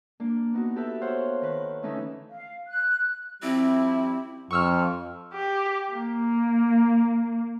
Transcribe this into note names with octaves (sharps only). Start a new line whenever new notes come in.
A#3 D4
B3 D#4 F#4
G4 A4 B4 E5
C5 C#5 F5 F#5
D#3 B4 F#6
D3 E3 A3 C#4 D#4 A4
F5
F#6
F3 G3 C4 E4
F2 C#6 E6 F6
G4
A#3